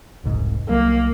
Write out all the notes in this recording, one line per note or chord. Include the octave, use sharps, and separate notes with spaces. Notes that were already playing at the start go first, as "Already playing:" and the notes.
E1 C2 G#2
C2 F#3 A#3